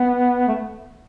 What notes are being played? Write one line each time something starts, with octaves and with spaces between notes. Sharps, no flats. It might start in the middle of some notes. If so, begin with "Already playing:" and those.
Already playing: B3
A3